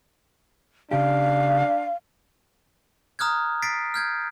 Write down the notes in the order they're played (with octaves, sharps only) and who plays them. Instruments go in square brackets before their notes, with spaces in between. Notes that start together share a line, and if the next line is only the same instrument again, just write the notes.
[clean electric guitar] C#3 G4 [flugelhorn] D4 [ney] F5
[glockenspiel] A#5 D#6 F6 F#6 G#6
A6 B6 C7 D7
F6 G6 G#6